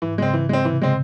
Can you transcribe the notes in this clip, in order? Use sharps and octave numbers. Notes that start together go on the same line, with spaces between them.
G#2 E3
C#3 G#3 C4
E3
G#3 C4
C3 E3
C#3 G#3 C4